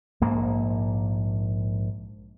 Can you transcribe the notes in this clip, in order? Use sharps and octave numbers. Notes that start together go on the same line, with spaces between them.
A#1 G#2 A#3